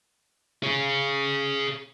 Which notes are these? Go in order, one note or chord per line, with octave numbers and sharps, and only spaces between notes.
G#4 C#5